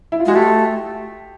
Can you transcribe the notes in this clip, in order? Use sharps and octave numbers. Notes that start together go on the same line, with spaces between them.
E4
F4
G#3 F#4
A3 G4